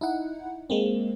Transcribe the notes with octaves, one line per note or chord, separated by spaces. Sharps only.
D#4 E4 F#5
G#3 A#3 C4